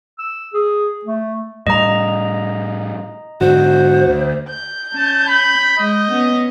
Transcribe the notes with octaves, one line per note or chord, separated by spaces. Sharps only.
E6
G#4
A3
A2 G3 D#5 A#5
G#2 D3 F#4 C5
D2
G6
C#4 A5
B5
G#3 D#5
B3 C#4